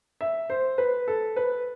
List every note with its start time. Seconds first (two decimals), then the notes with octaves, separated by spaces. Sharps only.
0.21 E5
0.50 C5
0.78 B4
1.08 A4
1.36 B4